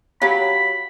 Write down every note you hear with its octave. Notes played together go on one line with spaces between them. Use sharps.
F#3 G4 C#5 F5 B5